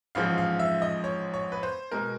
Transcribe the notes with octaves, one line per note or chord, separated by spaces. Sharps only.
A1 G#2 F3 G#3 F5
F5
E5
D#5
C#5
C#5
B4
C5
B2 G#3 A#4